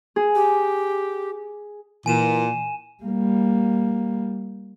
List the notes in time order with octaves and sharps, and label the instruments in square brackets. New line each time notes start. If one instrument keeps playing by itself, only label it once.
[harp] G#4
[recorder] G4
[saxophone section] A#2 [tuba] E3 [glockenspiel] G#5 D#7 E7
[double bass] G3 A#3